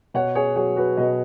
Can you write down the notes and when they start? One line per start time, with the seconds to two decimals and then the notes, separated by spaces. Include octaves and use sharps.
0.14 B2 C#5 F#5
0.35 G#4 C#5
0.56 F#3 G#4 C#5
0.76 F#4 B4
0.97 B2 B4 D#5